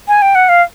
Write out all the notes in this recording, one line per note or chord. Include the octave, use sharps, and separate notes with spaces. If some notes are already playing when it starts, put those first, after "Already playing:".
G#5
G5
F#5
F5